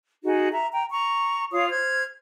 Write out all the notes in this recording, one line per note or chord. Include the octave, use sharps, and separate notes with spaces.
D#4 F#4 G#4
E5 A#5
G5 A#5
A#5 C#6
F4 C#5 F5 D#6
C5 F6 G#6